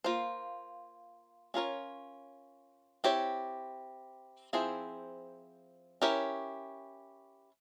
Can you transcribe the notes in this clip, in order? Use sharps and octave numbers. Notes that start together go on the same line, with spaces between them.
A#3 F4 C5
C#4 F4 A#4 C#5
C4 E4 G4 C#5
F3 C4 E4 G#4 C5
C#4 E4 G4 A#4 C#5